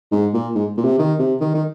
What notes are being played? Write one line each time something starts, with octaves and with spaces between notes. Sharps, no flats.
G#2
A#2
G#2
A#2
C3
D#3
C3
D#3
D#3